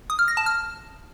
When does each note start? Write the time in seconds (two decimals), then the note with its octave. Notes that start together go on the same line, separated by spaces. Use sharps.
0.10 D#6
0.19 F6
0.28 A#6
0.37 A5
0.46 F6